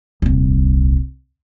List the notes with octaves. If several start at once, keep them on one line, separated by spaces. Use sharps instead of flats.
D#1 C2